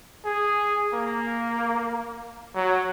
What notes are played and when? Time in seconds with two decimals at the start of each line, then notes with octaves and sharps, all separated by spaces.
0.25 G#4
0.94 A#3
2.56 F#3